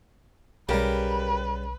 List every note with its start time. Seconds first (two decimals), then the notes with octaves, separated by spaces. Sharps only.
0.69 B1 C#3 G3 G4 A#4 B4